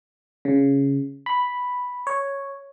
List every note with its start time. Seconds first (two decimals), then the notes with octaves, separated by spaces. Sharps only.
0.45 C#3
1.26 B5
2.07 C#5